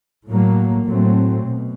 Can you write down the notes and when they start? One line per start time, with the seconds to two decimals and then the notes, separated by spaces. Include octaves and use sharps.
0.28 A2 F#3 A#3
0.87 A2 F#3 A3 C4
1.46 B2